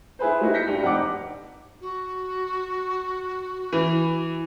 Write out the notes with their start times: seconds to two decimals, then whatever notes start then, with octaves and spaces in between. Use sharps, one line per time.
0.19 E4 G#4 B4 C5
0.41 G3 A3 A#3 D#4 E4 F#4
0.54 G6 A#6 B6 C#7
0.68 G2
0.83 F1 D#4 F#5 D6
1.81 F#4
3.73 E3